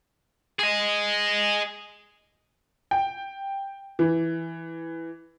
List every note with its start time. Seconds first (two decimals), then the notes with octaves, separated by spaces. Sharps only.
0.59 G#4 D#5
2.91 G5
3.99 E3